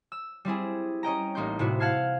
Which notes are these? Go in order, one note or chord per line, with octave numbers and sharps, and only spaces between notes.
E6
G3 C4 E4 G#4
C#4 D#5 G5 A#5
A1 A#3 D#4 G4 C6 G6
A2 C3 E4 F#4
F5 F#5 A5 F6 G#6 C7